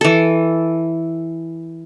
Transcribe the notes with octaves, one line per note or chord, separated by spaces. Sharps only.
E3 A4